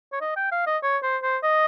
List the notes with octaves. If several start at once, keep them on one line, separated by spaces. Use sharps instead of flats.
C#5
D#5
G5
F5
D#5
C#5
C5
C5
D#5